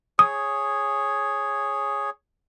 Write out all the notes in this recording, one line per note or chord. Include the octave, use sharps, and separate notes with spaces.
G#4 C#5 D#6